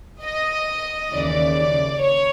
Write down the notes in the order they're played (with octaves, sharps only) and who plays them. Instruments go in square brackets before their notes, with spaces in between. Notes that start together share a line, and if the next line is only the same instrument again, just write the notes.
[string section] D#5
D#2 C#3 E3 D5
C#5